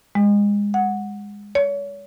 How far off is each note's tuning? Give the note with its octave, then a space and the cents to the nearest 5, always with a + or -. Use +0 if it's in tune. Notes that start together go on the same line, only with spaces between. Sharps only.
G#3 -25
F#5 -10
C#5 +35